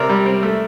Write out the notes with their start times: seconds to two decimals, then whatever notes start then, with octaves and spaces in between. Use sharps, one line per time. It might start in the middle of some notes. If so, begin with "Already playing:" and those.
Already playing: C3 A#4 D5
0.09 G3
0.26 C4
0.43 A3